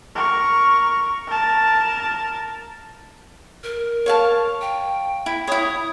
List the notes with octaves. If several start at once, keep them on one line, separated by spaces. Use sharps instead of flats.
A#4 C#6
A#4 A5
A#4
C#5 F5 A5
G5
E4
E4 C#5 D#6